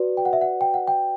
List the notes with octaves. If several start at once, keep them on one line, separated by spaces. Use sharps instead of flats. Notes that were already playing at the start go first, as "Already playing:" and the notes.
Already playing: F#4 B4 D5
G5
F#5
E5
F#5
G5
F#5
G5